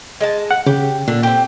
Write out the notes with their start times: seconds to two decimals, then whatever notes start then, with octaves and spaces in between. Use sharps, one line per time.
0.20 G#3 D#5 A5
0.51 F#5
0.66 C#3 G4
1.08 A#2 D3
1.23 C4 G4